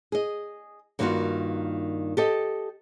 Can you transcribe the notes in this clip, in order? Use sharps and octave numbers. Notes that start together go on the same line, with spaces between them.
G#4 D#5
G2 D#3 A#3 C4 F4 F#4
G4 A4 D#5